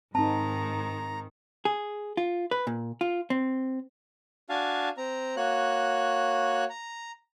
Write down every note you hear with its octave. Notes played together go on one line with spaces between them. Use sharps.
G#2 D#3 C4 D#4 A5 A#5
G#4
F4
B4
A#2
F4
C4
D4 F#4 F5 G#5 A5
C4 A#5
A#3 F#4 C#5 F#6
A#5